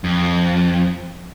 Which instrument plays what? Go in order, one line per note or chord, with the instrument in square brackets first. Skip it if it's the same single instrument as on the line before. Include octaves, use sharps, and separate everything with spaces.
[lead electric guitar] F2